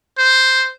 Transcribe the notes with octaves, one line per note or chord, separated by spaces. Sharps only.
C5